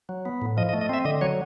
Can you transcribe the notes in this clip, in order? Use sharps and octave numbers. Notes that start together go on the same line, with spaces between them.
F#3
B3
A2
F3 D#5
D#5
A3
D#5
C4 E5
D3 D#5
F#3 C#5